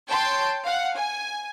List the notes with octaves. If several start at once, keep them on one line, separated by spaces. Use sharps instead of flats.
C#5 G5 A5 C6
F5 F#5
G#5